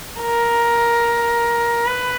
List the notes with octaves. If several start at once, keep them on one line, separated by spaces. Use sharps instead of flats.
A#4
B4